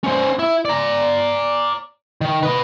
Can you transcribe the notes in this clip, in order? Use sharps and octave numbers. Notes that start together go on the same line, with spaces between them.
C#4 C5
E4
D5 A#5
D#3
B4 D#5